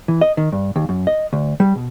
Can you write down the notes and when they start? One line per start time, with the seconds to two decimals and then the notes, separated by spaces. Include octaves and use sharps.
0.08 E3
0.21 D#5
0.37 D#3
0.52 G2
0.76 D#2
0.89 F#2
1.07 D#5
1.33 D2
1.60 G3
1.76 B2